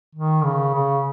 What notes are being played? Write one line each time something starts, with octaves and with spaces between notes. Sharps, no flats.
D#3
C#3
C#3